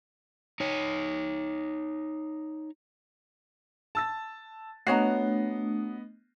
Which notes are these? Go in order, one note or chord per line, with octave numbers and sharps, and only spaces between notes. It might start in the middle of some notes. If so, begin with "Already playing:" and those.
D#4 C#5
A5 E6 A6
A3 B3 D4 F#4 C#5 D#5 A#5 C7